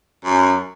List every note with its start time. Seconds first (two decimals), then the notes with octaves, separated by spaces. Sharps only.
0.25 F#2